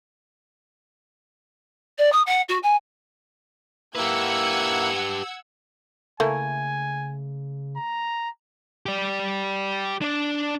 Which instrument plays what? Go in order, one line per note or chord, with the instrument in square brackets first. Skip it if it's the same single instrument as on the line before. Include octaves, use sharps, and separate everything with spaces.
[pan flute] D5
D#6
F#5
F#4
G#5
[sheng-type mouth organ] A#3 E4 [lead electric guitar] G4 B4 [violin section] F#5 E6 G#6
[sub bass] C#3 [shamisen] A3 A#3 E4 [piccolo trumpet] G#5
[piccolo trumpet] A#5
[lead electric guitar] G4 D5
D4 D5